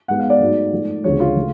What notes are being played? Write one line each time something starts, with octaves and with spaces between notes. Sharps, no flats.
G#2 G#3 B3 F#5
F5
D5
G#2 F#3 A3
G#2 F3 A3
D2 C#3 F3 G#3 C#5
F4
C#3 F3 A3